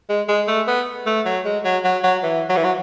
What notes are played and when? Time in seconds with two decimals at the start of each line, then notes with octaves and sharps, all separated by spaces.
0.09 G#3
0.29 G#3
0.48 A3
0.68 B3
1.06 A3
1.26 F#3
1.45 G#3
1.65 F#3
1.85 F#3
2.04 F#3
2.23 E3
2.49 F#3
2.57 E3
2.64 F#3